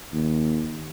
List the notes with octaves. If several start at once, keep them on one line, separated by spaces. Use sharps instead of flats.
D#2